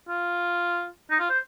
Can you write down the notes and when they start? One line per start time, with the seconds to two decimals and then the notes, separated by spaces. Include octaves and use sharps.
0.09 F4
1.10 D#4
1.20 F4
1.30 C5